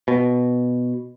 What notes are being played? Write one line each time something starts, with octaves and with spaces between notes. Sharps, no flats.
B2